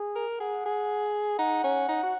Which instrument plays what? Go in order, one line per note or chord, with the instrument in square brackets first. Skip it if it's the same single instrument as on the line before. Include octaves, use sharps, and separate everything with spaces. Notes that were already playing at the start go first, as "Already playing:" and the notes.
Already playing: [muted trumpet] G#4
[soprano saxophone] A#4
[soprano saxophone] G#4 [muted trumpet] F#5
[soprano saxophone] G#4
[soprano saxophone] D#4 [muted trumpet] F#5
[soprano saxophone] C#4
D#4
F#4